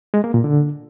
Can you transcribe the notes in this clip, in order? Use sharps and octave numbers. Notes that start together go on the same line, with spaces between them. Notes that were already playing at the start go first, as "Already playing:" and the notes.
G#3
A#3
A#2
D3